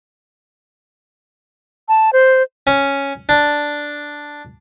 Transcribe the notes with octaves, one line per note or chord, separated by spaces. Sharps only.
A5
C5
C#4
D4